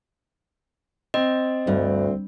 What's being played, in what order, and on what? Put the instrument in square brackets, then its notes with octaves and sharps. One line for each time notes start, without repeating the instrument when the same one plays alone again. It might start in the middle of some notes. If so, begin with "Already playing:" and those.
[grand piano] C4 [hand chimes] D#5
[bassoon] D2 [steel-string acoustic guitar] G2